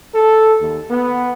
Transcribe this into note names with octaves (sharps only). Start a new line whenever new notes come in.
A4
D#2
B3